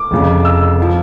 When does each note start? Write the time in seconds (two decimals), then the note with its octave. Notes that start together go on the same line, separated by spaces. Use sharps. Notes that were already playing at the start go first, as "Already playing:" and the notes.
Already playing: D6
0.11 F1 F2 C#3
0.45 E6
0.82 F3